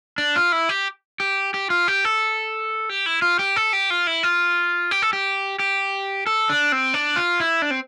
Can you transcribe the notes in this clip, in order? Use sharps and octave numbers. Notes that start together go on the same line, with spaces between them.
D4
F4
E4
G4
G4
G4
F4
G4
A4
G4
E4
F4
G4
A4
G4
F4
E4
F4
G4
A4
G4
G4
A4
D4
C4
D4
F4
E4
D4
C4